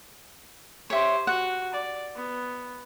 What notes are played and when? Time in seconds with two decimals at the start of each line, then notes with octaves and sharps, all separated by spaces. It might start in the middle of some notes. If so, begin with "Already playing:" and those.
0.90 G4 C5 C#5 E5
1.27 F#4 F#5
1.72 D5
2.15 B3